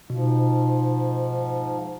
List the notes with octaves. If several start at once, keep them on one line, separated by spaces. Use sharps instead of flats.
G#2 B2 F3